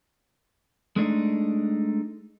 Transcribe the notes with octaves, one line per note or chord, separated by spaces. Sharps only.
G#3 A3 D4 D#4